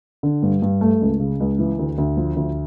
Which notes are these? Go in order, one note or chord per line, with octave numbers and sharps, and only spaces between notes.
D3
G2
G2
A3
C#2
C#3
C#2
E3
D2
D2
F3
D2